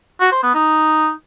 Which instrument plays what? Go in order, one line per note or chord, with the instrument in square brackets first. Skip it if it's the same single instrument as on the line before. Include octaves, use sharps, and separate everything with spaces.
[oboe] F#4
C5
B3
D#4